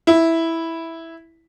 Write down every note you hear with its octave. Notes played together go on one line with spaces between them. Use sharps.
E4